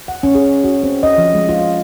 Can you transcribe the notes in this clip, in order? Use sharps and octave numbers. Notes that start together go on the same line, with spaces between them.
F#5
C#4
G#4
F#4
C4
D#5
F3
G#3
F4